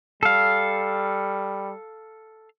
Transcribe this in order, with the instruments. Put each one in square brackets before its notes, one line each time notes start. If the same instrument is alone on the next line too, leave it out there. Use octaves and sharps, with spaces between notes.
[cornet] G3 [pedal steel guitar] A4 F5